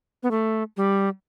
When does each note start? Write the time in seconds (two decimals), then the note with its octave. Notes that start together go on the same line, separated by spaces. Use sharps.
0.23 B3
0.31 A3
0.77 G3